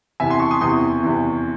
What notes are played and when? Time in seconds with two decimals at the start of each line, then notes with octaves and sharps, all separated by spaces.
0.20 E2 C3 E3 E5 G#5
0.30 G#5 C6
0.40 A5 C#6
0.51 C6 D#6
0.61 E2 C3 E3 C6 D#6
1.02 E2 C3 E3